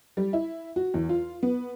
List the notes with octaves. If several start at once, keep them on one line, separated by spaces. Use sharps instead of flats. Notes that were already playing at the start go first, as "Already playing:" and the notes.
G3
E4
F#4
E2
F4
B3